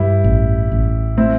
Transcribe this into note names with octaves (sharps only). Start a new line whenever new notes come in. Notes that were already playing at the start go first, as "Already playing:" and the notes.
Already playing: G2 E4 G4
A1
A1
A3 C4 E4